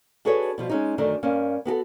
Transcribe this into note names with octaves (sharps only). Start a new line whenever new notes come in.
D4 F#4 G#4 A4 B4 C#5
B2 F3 G3
G#3 C#4 D#4
F#2 D3 D#3 A3 D4
G2 A#3 C#4
B3 F#4 G4 A4